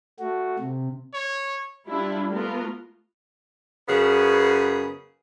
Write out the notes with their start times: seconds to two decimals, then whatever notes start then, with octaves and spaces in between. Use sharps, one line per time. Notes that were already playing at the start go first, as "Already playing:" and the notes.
0.19 A3 F#4
0.59 C3
1.14 C#5
1.87 G3 D4 E4 F4
2.32 A3 B3 F4 A#4
3.88 F#2 C#3 B3 G#4